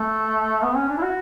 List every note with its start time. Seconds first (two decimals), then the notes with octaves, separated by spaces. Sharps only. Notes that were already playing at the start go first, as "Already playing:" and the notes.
Already playing: A3
0.63 B3
0.76 C#4
0.89 D4
0.98 E4
1.02 F#4